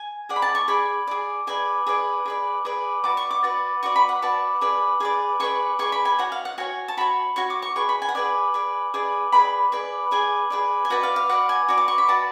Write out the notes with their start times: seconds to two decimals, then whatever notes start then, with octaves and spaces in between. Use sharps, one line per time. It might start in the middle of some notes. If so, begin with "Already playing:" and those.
Already playing: G#5
0.29 G#4 D5 F#5
0.36 B5
0.42 A5
0.55 C#6
0.68 G#4 D5 B5
1.07 G#4 D5
1.47 G#4 B4 D5 G#5
1.87 G#4 B4 D5
2.26 G#4 B4 D5
2.65 G#4 B4 D5
3.04 F#4 B4 D5 D6
3.17 C#6
3.31 D6
3.43 F#4 B4 D5
3.83 F#4 B4 D5 C#6
3.96 B5
4.09 F#5
4.22 F#4 B4 D5 A5
4.61 G#4 B4 D5
5.00 G#4 B4 D5
5.40 G#4 B4 D5 C#6
5.79 G#4 B4 D5 C#6
5.92 B5
6.05 G#5
6.19 F#4 C#5 F#5
6.32 F5
6.45 F#5
6.58 F#4 C#5 G#5
6.88 A5
6.97 F#4 C#5 B5
7.36 F#4 C#5 C#6
7.50 D6
7.62 C#6
7.76 G#4 B4 D5 C#6
7.89 B5
8.02 G#5
8.09 F#5
8.15 G#4 B4 D5 G#5
8.54 G#4 B4 D5
8.94 G#4 B4 D5
9.32 G#4 B4 D5 B5
9.72 G#4 B4 D5
10.11 G#4 B4 D5 G#5
10.50 G#4 B4 D5
10.85 G#5
10.90 F#4 B4 D5 F#5
11.03 F5
11.16 F5
11.29 F#4 B4 D5 F#5
11.49 G#5
11.68 F#4 B4 D5
11.78 D6
11.88 C#6
11.98 B5
12.08 F#4 B4 D5 A5